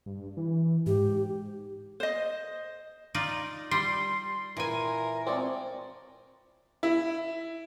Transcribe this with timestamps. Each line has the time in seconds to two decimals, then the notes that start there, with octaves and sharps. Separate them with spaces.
0.06 G2
0.37 E3
0.86 G#2 G4
2.00 C5 D#5
3.15 D#4 F4 D5
3.71 G3 C6
4.57 A#2 E3 A#4 G#5
5.27 F3 G#3 C4 C#5 D5
6.83 E4